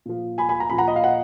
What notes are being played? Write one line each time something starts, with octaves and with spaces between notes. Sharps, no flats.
A#2 F3
G#5 B5
G#5 B5
A#5
A#2 F3 B5
F#5 A#5
D#5
F5
D#5 F#5